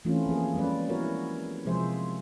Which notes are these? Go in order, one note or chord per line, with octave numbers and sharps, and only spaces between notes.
E3 A3 C4 C#4 E4 F4
F3 A#3 G#4
G3 G#3 C#4 B4 D5
B3 E4 F#4 A#4 C#5
C3 F3 G#3 G#4 C5 E5